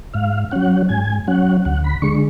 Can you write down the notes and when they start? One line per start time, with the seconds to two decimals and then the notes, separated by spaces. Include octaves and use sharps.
0.14 G#2 F5
0.51 F#3 C#4 F#5
0.89 G#2 G#5
1.27 F#3 C#4 F#5
1.65 D2 F#5
1.84 B5
2.02 D3 G#3 C#6